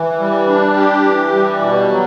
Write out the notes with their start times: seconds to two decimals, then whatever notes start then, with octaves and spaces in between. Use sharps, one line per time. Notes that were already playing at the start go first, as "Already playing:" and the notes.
Already playing: E3
0.19 G3
0.48 D4
0.76 G4
1.04 E3
1.33 G3
1.61 B2
1.89 F#3